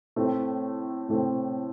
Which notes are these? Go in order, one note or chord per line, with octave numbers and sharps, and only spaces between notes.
A2 A3 C4
A2 A3 C4